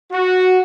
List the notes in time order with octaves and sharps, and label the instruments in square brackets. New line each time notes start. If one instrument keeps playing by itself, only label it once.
[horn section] F#4